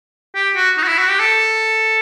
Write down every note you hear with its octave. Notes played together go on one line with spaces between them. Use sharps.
G4
F#4
D#4
F#4
E4
F#4
G4
A4